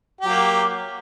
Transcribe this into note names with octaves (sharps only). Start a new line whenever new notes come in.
F#3 A#3 G4